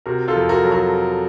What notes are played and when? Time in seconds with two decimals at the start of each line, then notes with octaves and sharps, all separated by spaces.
0.06 C3 F#4 A#4
0.28 F4 A4
0.35 F2
0.49 F#4 A#4
0.64 F#3
0.71 F#4 A#4